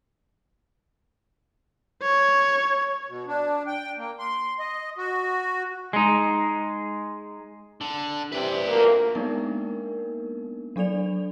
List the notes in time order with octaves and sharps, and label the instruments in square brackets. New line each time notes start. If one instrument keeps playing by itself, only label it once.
[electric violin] C#5
[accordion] B2
D4
G5
A#3
C6
D#5
F#4
[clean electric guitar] G#3 D#4
[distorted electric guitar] D3
[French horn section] C3 E3 [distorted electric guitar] B4 D5
[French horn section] D2 F3 A#3
[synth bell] G#3 A#3 B3 D4 D#4 A#4
F#3 D4 A4 D5 F7